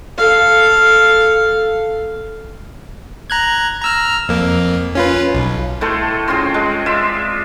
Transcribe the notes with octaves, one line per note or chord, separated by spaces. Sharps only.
A4 F5
A#5 F#6 G#6
A#5 E6 F6
F2 A#3
C#4 F4 B4
B1
A2 A3 A4 C5
C4 C#4 F4 G#4
G#3
F4 D5 E5